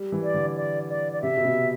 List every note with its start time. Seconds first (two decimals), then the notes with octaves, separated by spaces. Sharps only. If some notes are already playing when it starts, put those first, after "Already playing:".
Already playing: G3
0.12 E3
0.23 D5
0.34 D3
0.56 D5
0.89 D5
1.13 D5
1.22 C3 E5
1.37 B2
1.44 C3